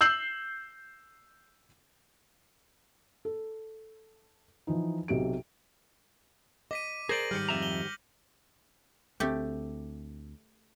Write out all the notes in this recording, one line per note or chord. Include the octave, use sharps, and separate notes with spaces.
E6 G6 C7 F#7
A4
E3 F3 D#4
B1 C3 F#4 G4 D7
D#5 D6 B6 D#7
G#4 A#4 C5 D5 A#6 F#7
G#2 D#3 G3 F6 G6 C#7
F2 E5 A#5
F7 G7
D2 A3 C4 G4